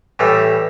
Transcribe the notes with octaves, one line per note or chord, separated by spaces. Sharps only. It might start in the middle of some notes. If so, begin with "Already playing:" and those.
A2 E3 G3 D5